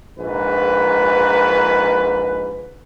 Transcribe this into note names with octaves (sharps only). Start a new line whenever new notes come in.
A#1 G#2 B4